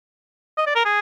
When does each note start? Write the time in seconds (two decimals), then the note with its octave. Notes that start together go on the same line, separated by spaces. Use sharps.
0.57 D#5
0.66 D5
0.75 A#4
0.85 G#4